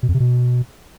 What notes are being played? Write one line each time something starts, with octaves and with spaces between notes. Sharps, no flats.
B2
F2
C3
B2